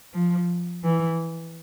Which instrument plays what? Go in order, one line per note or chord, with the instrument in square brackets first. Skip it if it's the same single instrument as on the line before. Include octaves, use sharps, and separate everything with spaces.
[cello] F3
E3